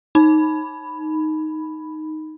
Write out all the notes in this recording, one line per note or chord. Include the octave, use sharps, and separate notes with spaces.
D#4 B5